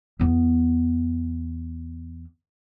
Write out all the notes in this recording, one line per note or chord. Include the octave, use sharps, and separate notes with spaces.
E2 B3